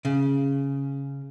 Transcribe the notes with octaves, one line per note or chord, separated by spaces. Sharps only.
C#3